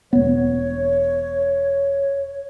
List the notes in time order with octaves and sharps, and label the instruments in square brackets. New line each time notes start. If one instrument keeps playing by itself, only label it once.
[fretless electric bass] E1 B3 [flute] C#5